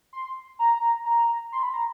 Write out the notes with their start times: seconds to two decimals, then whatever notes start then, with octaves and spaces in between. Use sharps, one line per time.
0.13 C6
0.59 A#5
1.05 A#5
1.52 C6
1.63 B5
1.74 A#5